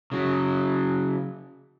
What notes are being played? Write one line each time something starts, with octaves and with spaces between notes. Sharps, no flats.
C#3 F#3